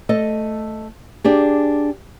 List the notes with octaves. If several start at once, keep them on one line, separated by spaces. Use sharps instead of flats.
A3 A4 D#5
D4 G4 G#4